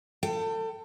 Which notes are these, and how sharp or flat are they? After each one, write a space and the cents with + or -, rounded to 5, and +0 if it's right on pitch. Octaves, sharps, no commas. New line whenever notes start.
A4 +30 G5 -15